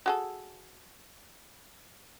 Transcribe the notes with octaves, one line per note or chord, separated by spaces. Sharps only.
F#4 G#4 A4